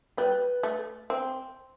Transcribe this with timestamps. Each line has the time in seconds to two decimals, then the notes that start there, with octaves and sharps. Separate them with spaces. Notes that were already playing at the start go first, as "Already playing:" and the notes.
0.17 G3 B4
0.63 A3
1.10 C4